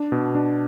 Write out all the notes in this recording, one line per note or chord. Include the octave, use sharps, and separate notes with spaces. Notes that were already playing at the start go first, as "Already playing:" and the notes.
Already playing: D4
B2
D4